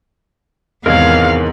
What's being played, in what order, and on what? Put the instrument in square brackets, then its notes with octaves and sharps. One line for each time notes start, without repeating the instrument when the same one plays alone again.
[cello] E2 [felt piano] G#2 C3 D#3 [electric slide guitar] A#4 C#5 [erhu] F5